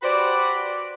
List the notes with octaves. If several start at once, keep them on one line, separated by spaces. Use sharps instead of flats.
F#4 G4 B4 C5 D5